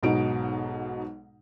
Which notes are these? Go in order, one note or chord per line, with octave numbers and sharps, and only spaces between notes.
B1 G#2 B2 D#4 D7